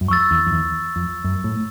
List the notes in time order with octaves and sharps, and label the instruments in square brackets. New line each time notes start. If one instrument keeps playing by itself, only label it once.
[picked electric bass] F#2
[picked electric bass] F2 [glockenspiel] C#6 E6 A6
[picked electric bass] E2
F2
E2
F2
F#2
A2